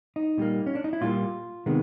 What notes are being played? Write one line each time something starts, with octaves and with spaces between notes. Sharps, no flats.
D#4
A#2 G3 A#3
C#4
D4
D#4
E4
A#2 G3 A#3 F4
C3 D#3 G#3 B3